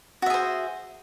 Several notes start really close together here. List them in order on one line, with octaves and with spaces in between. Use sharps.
F#4 E5 G#4 C5